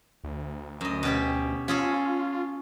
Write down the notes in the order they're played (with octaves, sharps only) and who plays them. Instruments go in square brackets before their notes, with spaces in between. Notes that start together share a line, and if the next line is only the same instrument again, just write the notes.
[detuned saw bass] D2
[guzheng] F#2 D#5
B2 C#4 G4
[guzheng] C#4 G#4 A4 [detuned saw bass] F4